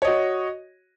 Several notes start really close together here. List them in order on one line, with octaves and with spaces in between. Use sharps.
C#5 D#5 F#4